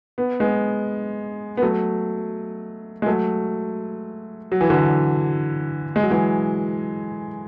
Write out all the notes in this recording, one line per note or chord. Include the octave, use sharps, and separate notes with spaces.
B3
G#3 B3
B3
F#3 A3
G#3
F#3 A3
F#3
E3
D3 F#3
G#3
F#3
E3 G#3